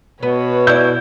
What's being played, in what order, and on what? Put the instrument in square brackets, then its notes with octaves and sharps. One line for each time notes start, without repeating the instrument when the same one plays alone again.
[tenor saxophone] B2 [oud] B3 [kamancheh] B4 C#5
[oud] E4 D5 [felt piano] G6